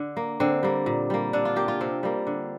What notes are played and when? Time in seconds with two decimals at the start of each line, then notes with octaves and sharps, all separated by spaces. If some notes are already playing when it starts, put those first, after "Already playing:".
Already playing: D3
0.17 A#3
0.40 D3 C4
0.63 G3 A#3
0.86 A#2
1.10 G3 A#3
1.33 D3 D4
1.45 F4
1.56 A#3 G4
1.68 F4
1.80 C3 C4
2.03 G3 A#3
2.27 D3